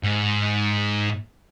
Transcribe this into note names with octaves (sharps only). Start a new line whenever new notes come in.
G#2